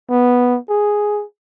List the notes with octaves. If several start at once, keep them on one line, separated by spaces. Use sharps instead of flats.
B3
G#4